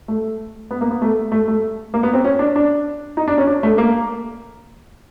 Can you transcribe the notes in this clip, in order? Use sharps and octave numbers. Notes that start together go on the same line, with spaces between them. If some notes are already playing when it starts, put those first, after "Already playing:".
A3
B3
A#3
B3
A3
A3
A3
A#3
B3
C4
C#4
D4
D4
D#4
D4
C#4
D4
A3
A#3